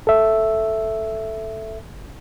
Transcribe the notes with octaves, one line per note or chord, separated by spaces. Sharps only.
A4 E5